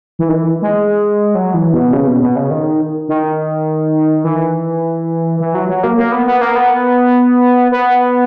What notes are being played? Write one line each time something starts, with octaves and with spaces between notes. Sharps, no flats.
E3
D#3
E3
G#3
F#3
E3
B2
C#3
B2
B2
C#3
D#3
D#3
E3
E3
F#3
F#3
A#3
A#3
B3
B3
A#3
B3
B3